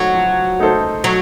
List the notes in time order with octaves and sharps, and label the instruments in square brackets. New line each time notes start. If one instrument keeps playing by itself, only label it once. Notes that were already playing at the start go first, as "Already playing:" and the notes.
Already playing: [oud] F#3 [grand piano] A3 D#4 A4
[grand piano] F3
A3 D#4 A4 C5
[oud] F#3